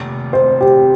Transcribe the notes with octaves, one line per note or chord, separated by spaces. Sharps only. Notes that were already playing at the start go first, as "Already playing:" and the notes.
Already playing: F1 D#2
C5
G4